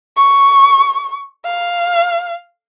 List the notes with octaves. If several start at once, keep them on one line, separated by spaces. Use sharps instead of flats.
C#6
F5